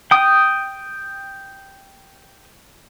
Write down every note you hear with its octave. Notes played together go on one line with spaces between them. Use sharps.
G5 D#6